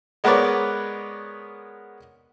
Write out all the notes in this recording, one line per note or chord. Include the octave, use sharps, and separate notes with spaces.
G#3 B3 A#4 B4 C#5 D5